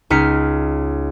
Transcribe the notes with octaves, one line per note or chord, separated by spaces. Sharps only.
C#2 D#4 F6 B6 C#7